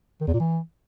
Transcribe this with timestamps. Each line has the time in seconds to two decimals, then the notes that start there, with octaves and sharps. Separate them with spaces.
0.21 D#3
0.27 E2
0.34 A#2
0.40 E3